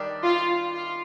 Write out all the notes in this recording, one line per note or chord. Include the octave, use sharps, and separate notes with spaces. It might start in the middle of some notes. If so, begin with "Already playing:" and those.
Already playing: D#3 G3 D4
F4
F4